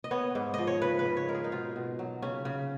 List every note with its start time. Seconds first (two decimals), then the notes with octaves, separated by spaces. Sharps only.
0.04 D#5
0.11 B3 C#5
0.35 G#2
0.54 F3 D#5
0.67 C#5
0.82 C#3 B4
0.99 B4
1.05 C#3
1.17 C#5
1.28 G#3 A#4
1.35 G#4
1.44 D#4
1.52 B2 F4
1.76 B2
1.99 F#3
2.22 C#3 C#4
2.45 C#3